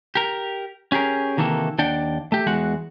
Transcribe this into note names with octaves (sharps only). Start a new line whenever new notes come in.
G4 A#4
C#4 G4 G#4 A#4
C3 D#3 E3 A#3 A4
D#2 D4 D5 F#5 G5
A3 G4
E2 G#3 F#4 F#5